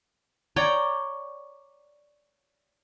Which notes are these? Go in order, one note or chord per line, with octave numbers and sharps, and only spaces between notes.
C#5 D5 G5 A#5